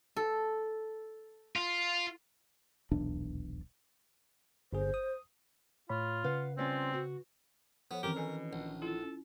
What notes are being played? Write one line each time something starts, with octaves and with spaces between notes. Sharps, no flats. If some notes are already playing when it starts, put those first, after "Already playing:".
A4
F4
D#1 B1 E2 D4
G1 G#4 C5
D#6
A2 F4 C#5 B5
C#3 B4 F5 F#5
G3 C4 C#4 F4
F#4
F3 B3 A4 C#5
D#3 E3 C4 C#4 G4 A#4
B2 A4 G#5
A#1
E4 F4 A4
C#4